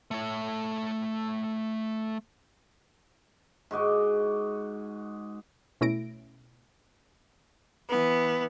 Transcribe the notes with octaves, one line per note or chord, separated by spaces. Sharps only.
A3 C#5
G#2 F#4 D#5 D6
B2 A3 C#4 E4 A#6 D7
E3 B3